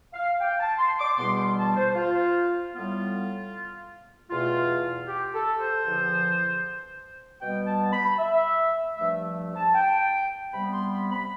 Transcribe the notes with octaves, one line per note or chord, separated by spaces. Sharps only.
F5
G5
A5
C6
D6
E2 B2 G3 B3 C6
C6
A5
C5
F4
A2 G3 B3 F4
E2 B2 A3 F4
G4
A4
C5
E2 D3 F3
B2 G3 B3 G5
A5
B5
E5
G2 F3 A3 E5
A5
G5
C3 G3 B3 B5
C6
B5
B5